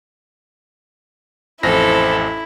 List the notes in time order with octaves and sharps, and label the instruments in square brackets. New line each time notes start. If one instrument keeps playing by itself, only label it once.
[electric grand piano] A1 F2 A#6 [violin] E4 [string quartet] A4 [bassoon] C5